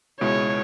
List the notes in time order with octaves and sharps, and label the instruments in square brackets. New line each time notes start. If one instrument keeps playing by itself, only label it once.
[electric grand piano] C#2 B2 G#3 E4 [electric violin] C#5